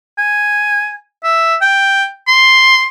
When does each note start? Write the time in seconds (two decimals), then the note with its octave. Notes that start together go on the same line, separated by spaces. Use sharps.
0.18 G#5
1.23 E5
1.62 G5
2.28 C6